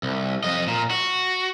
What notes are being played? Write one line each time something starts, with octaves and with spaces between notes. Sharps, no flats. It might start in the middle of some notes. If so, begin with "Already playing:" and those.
C2
F2 D#5
A#2
F#4